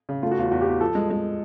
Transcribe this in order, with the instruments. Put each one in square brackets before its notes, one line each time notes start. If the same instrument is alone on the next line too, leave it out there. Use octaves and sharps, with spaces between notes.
[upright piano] C#3
[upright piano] A3 [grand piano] F4
[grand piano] F#4
[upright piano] E2 [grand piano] F4
[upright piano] E2 [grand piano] F#4
[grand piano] G4
[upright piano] E2
[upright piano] F3 [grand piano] A4
[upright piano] G#3
G#3